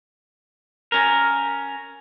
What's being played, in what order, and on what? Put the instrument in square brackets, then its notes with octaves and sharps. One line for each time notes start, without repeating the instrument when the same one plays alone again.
[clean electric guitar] C#4 A#4